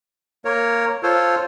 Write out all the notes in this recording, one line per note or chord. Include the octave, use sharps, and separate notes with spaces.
A#3 A#4 C#5
F4 A4 C5 C#5